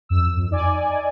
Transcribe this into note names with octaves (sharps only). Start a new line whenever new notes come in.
F2 E6
F2
D#4 D5 G#5